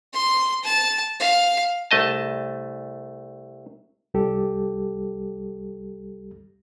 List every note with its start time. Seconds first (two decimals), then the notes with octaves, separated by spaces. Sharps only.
0.13 C6
0.64 A5
1.20 F5
1.91 C2 A3 D#5 A5
4.14 C2 G3 G4 A4